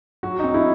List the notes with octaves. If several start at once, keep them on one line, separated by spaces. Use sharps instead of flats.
F#3 F#4
C4 D#4
E4